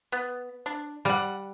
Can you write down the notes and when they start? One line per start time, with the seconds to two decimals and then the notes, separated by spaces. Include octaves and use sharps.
0.12 B3
0.66 D4
1.05 G3 F5 F#5